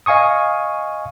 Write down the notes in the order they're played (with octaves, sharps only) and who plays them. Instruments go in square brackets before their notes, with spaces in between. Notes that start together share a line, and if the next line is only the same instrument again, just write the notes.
[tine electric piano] D#5 F5 G#5 C#6 D#6